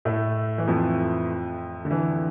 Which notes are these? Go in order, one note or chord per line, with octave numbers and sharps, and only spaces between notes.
A2 A3
E3
F2 F3
D3
E3